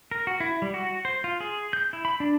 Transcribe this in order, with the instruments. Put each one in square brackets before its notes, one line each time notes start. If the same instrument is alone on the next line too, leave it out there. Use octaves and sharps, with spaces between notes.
[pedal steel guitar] A#4
F#4
E4
G3
F#4
C5
F4
G#4
G6
E4
B5
D4